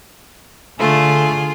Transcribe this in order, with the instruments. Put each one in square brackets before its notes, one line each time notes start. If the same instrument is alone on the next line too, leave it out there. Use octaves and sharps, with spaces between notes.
[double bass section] D3 [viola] A3 [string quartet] F4 G#4